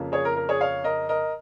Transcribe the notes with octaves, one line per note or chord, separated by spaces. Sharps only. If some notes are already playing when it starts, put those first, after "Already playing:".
Already playing: F2 C#3 F3 A#3 C#4
G#4 C#5
A#4
A#4
G#4 C#5
C#5 F5
A#4 D#5
A#4 D#5